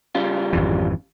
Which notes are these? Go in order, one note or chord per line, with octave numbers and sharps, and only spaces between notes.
C#3 G3 F4
G#1 F2 E3